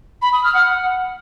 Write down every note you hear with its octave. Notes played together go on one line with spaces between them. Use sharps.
B5
D#6
F6
F#5